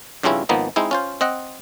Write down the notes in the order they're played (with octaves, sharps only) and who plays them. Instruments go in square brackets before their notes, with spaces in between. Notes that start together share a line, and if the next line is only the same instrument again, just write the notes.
[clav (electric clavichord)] G2 C#3 F3 C4 C#4 E4
G#1 F3 A#3 B3 D#4
G#3 C4 D#4 E4
C#4 F4 C5
C4 D#5 F#5